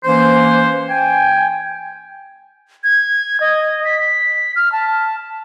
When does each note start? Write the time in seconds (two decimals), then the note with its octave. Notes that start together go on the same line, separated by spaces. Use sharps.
0.04 E3 A#3 C#4 C5
0.89 G5 G#5
2.84 G#6
3.40 D#5
3.85 B6
4.56 F6
4.72 A5